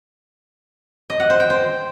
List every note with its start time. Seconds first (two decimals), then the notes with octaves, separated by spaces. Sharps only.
1.10 D#5
1.20 F#5
1.30 C5
1.40 G5
1.50 C5